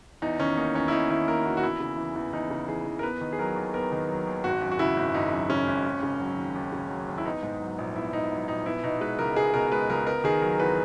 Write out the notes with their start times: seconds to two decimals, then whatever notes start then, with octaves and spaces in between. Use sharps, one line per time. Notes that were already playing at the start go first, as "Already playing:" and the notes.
0.22 E2 D#4
0.39 D#3 C#4
0.57 A#3 D#4
0.75 E2 C#4
0.88 E4
0.92 E2 D#4
1.10 D#3 E4
1.28 A#3 A#4
1.45 E2 F#4
1.57 F#4
1.63 E2 E4
1.80 C#3
1.97 E3
2.15 E2
2.33 E2 D#4
2.50 C#3
2.68 E3 G#4
2.86 E2
2.99 A#4
3.03 B3 B4
3.21 D#3
3.33 G#4
3.39 F#3 A#4
3.56 D#2
3.74 B3 A#4
3.92 D#3
4.09 F#3
4.27 D#2
4.44 G#1 F#4
4.62 F#2
4.71 F#4
4.79 C#3 E4
4.96 G#1
5.14 G#1 D#4
5.32 F#2
5.49 C#3 C#4
5.67 G#1
5.84 D#2
6.03 C#3
6.20 F#3
6.37 D#2
6.55 D#2
6.72 C#3
6.90 F#3
7.08 D#2
7.18 E4
7.25 B3 D#4
7.43 G#2
7.61 F#3
7.78 A#1
7.95 B3 E4
8.13 G#2 D#4
8.31 F#3
8.48 A#1 D#4
8.66 B3 E4
8.83 B2 D#4
9.01 G#3 B4
9.19 C#2 A#4
9.36 B3 G#4
9.53 B2 A#4
9.72 G#3 B4
9.90 C#2 A#4
10.07 B3 A#4
10.24 D#3 G#4
10.42 F#3 A#4
10.59 E2 B4